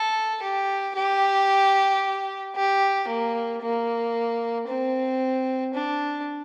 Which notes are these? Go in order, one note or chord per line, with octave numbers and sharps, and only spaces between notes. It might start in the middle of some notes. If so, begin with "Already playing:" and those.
Already playing: A4
G4
G4
G4
A#3
A#3
C4
D4